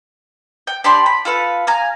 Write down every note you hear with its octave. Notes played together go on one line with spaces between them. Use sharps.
G5
D4 G4 B5 C6
B5
F4 A4 B4 F5
F5 G#5 A#5